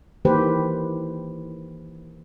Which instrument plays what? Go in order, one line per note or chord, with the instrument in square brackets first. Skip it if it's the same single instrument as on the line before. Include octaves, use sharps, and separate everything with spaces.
[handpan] D#3 E3 A#3 G4 B4 C5